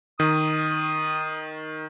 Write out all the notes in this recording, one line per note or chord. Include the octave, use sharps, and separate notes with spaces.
D#3 D#6